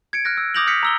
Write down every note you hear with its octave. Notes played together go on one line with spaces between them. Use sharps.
G#6 C#7 D7
F6 F#6 A#6
E6
D6 D#6 G6 A#6 F7 F#7
D#6 F6 G6 A#6 B6 C#7
A#5 E6 G7